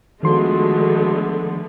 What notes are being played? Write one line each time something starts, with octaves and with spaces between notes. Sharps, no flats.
D3 D#3 F3 G#3 A3 B3 F#4 C6